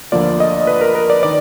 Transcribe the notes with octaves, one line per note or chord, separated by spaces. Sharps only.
D2 D3 F3 A#3 F4 D5
D#5
B4
A#4
A#4
D5
D#3 D5